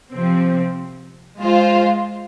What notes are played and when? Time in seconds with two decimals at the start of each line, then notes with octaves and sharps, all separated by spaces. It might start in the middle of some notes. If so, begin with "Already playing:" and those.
0.13 C3 F3 C4
1.40 G#3 F4 C5